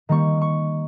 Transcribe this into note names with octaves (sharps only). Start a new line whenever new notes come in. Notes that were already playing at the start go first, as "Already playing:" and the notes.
D#3 G3 A#3 C#6
C#6